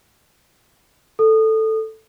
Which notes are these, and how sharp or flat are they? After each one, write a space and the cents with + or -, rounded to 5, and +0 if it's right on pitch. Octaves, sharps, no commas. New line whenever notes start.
A4 +0 D#6 -25